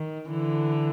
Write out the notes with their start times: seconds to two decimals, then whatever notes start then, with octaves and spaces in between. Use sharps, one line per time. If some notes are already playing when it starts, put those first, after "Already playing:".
Already playing: D#3
0.30 D3 E3